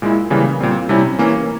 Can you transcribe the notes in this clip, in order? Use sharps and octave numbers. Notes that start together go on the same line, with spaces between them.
A#2 G#3 E4
C#3 E3 G3 A#3
A#2 G3 C4
C3 G3 C#4 E4
E3 A#3 C#4